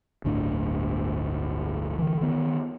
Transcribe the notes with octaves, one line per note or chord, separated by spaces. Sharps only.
G1 D2 A2 D4
D3 E3
D#3 B3